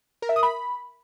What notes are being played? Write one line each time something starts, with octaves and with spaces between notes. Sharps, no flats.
A#4
E5
D#6
B5